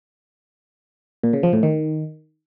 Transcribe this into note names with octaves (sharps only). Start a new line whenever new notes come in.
A#2
C#3
F3
A2
D#3